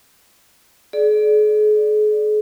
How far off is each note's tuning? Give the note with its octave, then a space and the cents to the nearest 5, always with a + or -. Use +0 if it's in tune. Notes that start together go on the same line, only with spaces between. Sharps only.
G#4 +40 D5 +0